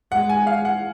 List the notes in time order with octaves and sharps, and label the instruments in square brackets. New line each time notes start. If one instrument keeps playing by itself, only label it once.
[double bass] G#3 [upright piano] F#5
[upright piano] G#5
F5
F#5